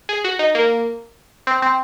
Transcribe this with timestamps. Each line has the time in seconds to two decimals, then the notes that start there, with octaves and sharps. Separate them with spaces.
0.09 G#4
0.24 F#4
0.39 D#4
0.55 A#3
1.47 C4
1.62 C4